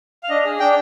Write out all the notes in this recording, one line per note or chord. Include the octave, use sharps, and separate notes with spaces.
F5
D4 D#5
G#4
D4 G5